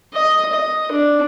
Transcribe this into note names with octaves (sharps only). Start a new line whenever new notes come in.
D#5
D#5
D4